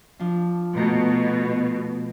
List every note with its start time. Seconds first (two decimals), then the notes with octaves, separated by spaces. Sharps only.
0.19 F3 D4
0.76 B2 A3 A#5 G6